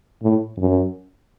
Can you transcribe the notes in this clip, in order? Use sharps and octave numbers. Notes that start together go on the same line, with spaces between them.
A2
F#2